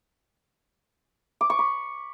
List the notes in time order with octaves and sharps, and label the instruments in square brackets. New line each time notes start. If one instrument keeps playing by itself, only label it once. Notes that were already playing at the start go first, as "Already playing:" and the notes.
[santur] D6
C#6
B5